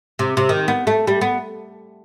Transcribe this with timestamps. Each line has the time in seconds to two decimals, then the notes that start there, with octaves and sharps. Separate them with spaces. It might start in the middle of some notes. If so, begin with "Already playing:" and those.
0.19 C3
0.37 C3
0.49 D#3
0.68 B3
0.87 A3
1.07 G3
1.21 B3